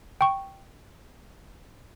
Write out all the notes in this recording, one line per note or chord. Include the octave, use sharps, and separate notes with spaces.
G5 C#6